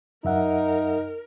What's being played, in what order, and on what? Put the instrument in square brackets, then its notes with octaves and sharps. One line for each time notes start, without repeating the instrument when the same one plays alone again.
[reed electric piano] F#2 E5 F#5 [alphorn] D#4 [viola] A#4